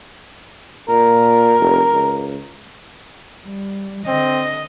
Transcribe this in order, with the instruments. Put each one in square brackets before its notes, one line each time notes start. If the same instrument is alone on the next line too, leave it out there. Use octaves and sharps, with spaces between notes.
[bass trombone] A#2 [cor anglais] A#4
[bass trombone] F1
C#2
[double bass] G3
[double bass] D3 [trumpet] C4 [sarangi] D#5